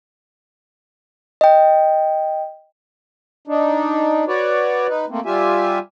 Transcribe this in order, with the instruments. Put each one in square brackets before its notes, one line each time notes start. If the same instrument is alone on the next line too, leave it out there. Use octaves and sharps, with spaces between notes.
[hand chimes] D#5 G5
[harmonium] D4 D#4
F#4 B4 C#5 D5
D#4 B4
A3 A#3 C4
G3 F4 G4 E5 G#5